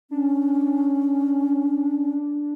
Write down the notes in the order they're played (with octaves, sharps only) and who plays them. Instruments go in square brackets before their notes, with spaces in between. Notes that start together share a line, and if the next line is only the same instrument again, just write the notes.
[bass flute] C#4 [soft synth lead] D4